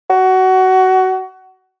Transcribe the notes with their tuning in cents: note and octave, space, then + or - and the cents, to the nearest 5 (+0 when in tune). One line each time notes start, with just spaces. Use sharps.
F#4 +20